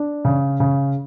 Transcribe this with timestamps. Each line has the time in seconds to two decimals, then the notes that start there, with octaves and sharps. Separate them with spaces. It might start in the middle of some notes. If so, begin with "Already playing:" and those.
Already playing: D4
0.25 C#3
0.60 C#3